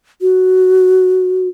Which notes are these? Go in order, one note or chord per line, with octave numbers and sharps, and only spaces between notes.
F#4